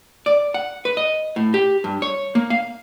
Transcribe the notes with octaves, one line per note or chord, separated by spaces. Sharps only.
D5
F#5
B4
D#5
A2
G4
G2
C#5
A#3
F5